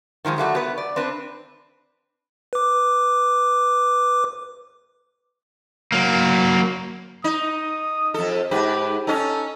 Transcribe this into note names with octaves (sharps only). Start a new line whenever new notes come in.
D#3 F3 G3 G#3
F#3 G3 A3 F#4
B3 B4
D5
C4 D4 B4
B4 D6
F#3 A#3
D#4 D#6
F2 A4
G#2 G4 B4
C#4 D#4 A4